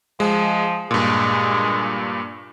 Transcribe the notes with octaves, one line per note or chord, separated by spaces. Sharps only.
F3 G#3
G2 A#2 G#3